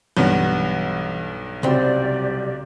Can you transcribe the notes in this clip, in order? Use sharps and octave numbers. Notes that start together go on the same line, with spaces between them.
B1 G2 E3 B3
C2 C#3 C4 F#4 G4 D5